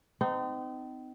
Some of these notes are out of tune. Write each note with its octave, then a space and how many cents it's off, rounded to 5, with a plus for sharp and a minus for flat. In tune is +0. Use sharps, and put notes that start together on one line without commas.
C4 -35 D#4 -10